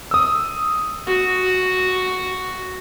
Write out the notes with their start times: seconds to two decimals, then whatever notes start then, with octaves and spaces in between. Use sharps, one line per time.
0.11 D#6 E6
1.07 F#4